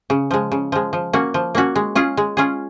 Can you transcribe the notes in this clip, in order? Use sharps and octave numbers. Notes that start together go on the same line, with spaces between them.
C#3
F3 G#3
C#3
F3 G#3
F3
A#3 C#4 F#4
F3
A#3 C#4 F#4
G#3
C#4 F4 G#4
G#3
C#4 F4 G#4